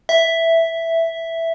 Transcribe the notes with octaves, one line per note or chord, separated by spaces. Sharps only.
E5